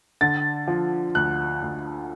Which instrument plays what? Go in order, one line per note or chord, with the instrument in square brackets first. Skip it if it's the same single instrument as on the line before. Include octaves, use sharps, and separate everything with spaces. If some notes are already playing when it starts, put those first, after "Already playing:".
[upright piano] D3 A6
F3
D2 F#6
D2